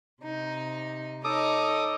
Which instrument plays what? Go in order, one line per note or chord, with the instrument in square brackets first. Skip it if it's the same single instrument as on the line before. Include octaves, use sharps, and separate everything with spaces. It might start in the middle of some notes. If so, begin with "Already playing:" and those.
[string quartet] C3 D#4
[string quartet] D#4 C#5 D#5 [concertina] A4 D6 D#6